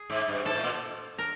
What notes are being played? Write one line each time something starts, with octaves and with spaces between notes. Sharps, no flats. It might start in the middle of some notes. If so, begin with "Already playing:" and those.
Already playing: G#4
G#2
G2
G#2 A4
A2
A#2
A#4